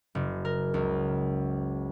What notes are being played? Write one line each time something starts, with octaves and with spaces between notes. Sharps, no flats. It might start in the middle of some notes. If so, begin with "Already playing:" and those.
F#1
A#4
C#2